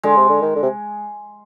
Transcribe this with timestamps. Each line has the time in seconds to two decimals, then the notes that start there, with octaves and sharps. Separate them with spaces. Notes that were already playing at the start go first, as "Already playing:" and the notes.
0.03 D3 G#3
0.17 C3
0.29 D3
0.42 D#3
0.56 D3
0.62 C3